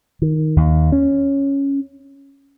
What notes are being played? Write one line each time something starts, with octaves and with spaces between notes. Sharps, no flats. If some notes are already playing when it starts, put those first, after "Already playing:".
D#3
D#2
C#4